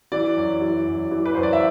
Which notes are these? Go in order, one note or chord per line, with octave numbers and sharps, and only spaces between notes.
E3 D5
F#2
E3
F#2
E3
B4
F#2 C5
D5
E5